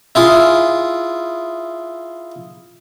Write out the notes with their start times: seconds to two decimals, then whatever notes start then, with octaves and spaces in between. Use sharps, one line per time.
0.15 E4 F4 G#4